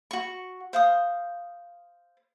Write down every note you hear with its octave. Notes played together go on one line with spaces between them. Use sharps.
F#4 C#6
C5 F5 D#6